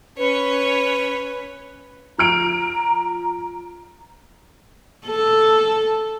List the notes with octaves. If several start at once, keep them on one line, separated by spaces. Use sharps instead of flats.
C#4 B4 C#5
F3 A#5 F6 D7
A4